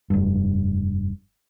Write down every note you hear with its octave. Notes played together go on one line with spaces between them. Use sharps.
F1 G2